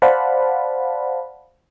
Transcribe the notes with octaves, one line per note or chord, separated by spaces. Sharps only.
C5 D5 F5 F#5 A5 B5